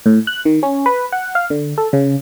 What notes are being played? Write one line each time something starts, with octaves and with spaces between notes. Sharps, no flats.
A2
F#6
D#3
C#4
B4
F#5
F5
D3
A4
C#3